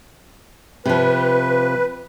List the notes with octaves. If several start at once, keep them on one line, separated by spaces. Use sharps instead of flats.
C3 F3 B4